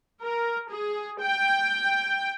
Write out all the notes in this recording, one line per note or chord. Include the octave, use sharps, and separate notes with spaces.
A#4
G#4
G5